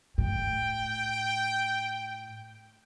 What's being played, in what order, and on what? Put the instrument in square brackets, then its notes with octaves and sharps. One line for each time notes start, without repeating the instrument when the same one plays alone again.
[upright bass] A2 [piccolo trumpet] G5